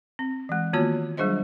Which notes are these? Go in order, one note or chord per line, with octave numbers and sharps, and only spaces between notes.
C4
E3 G#3
D#3 A#3 B3 F4 F#4 C#5
F#3 G3 D4 G#4 C5 D#5